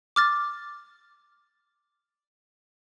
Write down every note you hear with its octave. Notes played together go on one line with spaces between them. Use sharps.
D6 F6 A6